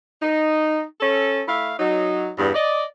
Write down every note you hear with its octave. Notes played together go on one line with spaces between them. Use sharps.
D#4
C#4 A4
A3 E4 E5 F5
F#3 D#4
E2 G2
D5 D#5